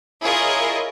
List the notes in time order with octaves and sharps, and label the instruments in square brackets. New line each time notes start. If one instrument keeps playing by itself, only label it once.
[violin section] E4 F4 G#4 A#4 C#5 D#5